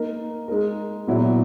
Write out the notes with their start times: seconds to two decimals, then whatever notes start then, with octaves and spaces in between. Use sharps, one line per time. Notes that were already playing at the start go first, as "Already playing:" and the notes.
Already playing: A#3 D#4 A#4
0.48 G#3 D#4 A#4
1.07 A#2 F#3 B3 E4